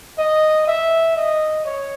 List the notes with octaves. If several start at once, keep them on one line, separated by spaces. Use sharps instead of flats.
D#5
E5
D#5
C#5